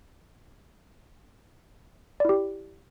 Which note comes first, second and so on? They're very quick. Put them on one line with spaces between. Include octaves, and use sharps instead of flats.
D5 E4 G4